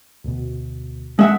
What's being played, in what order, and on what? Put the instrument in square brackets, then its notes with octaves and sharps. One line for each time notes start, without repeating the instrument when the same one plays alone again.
[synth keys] D2 B2
[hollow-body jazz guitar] G#3 E5 F#5